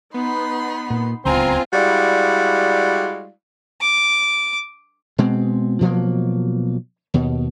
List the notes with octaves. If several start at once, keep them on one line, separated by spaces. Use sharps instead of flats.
B3 D#4 B5 C6
A#2
D1 C#2 B3 C4 F4 G#5 A#5 C6
G3 G#3 E4 F#4 D5 F5
D6
B2 G#3 C4
B2 F3 F#3 A#3
D#2 B2